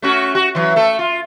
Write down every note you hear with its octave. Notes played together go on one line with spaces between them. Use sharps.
A3 C#4 F#4
F#4
E3 F#3
A3 A4
F4